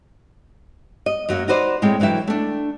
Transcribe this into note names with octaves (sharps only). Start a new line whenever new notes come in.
D#5
F#2 F#3 A#3
D#4 F#4 B4 C5 D5
A2 G#3 C4 C#5 G5
D3 E3 F#3 E5 G5
A3 D4